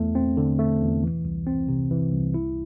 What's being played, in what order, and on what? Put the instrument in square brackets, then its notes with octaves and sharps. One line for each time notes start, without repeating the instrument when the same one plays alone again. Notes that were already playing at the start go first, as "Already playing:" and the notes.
Already playing: [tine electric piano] E2 A3
C4
D3
A3
E2
E3
C2
C4
C3
E3
C2
E4